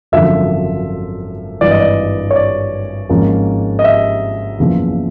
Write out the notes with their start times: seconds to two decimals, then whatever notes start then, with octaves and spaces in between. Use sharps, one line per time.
0.12 G#1 F#2 D3 F3 E5
1.61 G#1 G2 E3 D5
1.71 D#5
1.80 D5
2.31 C#5
2.36 D5
3.09 G#1 G#2 F3 A#3 C#4
3.79 D#5
3.84 E5
4.59 F#1 E2 C#3 F3